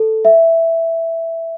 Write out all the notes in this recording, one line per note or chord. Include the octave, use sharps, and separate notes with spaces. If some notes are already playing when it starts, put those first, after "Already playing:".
Already playing: A4
E5